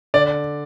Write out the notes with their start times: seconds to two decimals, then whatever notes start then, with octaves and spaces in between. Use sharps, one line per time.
0.14 D3 D5